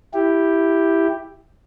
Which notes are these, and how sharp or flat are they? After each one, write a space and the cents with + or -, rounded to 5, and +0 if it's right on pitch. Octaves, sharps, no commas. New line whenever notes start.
E4 +0 G4 +0